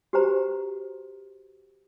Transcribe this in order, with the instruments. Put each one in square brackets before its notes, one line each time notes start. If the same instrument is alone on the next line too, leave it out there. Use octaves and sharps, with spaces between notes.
[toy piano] F#4 G4 B4 C5 A#5